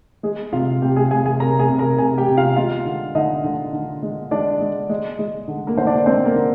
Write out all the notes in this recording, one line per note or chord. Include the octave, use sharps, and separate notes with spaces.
G#3 G#4
C3 F4 F5
C3 G4 G5
G#4 G#5
C3 G#4 G#5
G#4 G#5
C3 A#4 A#5
G#4 G#5
C3
A#4 A#5
C3 G#4 G#5
G4 G5
C3
F4 F5
G#3 F4 F5
D3
D3 D#4 D#5
D3
D3
G#3
G#3 D4 D5
G#3
G#3
G#3
D3
A#3 A#4
D3 C5
D4 D5
G#3 C4 C5
A#3 A#4
D3